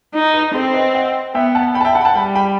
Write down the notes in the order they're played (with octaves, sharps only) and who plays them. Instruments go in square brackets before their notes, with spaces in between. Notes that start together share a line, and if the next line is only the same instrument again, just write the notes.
[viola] D#4
[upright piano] B4
[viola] C4 [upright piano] A4 C5
[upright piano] B4 D#5
D#5 F#5
[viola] B3 [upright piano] E5 G5
[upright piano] F#5 A5
G5 B5
A5
E5 G5
F#5 A5
B5
F#5 A5
[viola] G3 [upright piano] G5 B5
[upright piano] G5 B5